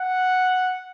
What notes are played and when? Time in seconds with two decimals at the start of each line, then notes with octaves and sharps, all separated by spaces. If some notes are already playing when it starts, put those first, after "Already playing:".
Already playing: F#5